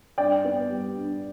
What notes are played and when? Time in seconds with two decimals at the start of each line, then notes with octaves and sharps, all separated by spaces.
0.18 G2 D5 G5
0.45 B3
0.70 G3
0.96 G2